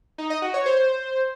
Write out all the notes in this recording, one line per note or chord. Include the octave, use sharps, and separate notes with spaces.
D#4
D#5
F#4
C#5
C5